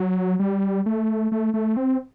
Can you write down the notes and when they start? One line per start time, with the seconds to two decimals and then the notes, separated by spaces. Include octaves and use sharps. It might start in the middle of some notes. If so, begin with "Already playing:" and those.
Already playing: F#3
0.39 G3
0.86 A3
1.32 A3
1.54 A3
1.77 C4